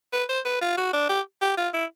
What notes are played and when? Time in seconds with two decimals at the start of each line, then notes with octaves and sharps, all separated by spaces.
0.13 B4
0.29 C5
0.45 B4
0.61 F4
0.77 F#4
0.93 D4
1.09 G4
1.42 G4
1.57 F4
1.73 E4